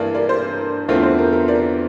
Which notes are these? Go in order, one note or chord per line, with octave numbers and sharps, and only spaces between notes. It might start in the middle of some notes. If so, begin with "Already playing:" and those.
Already playing: G2 E3 A#3 A#4 D5
A#4 D5
C5
E2 D3 A3 C4 F4 A#4
C5
A#4
A#4
A#4 D5